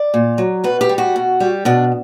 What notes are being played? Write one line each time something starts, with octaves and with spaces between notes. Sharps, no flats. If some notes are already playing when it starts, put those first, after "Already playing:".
Already playing: D5
A#2
F#3
B2 B4
G4
G3
F#4
B2
G3
B2 D4